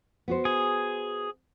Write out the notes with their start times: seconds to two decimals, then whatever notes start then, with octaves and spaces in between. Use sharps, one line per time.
0.28 B3 F#4 C5
0.45 G#4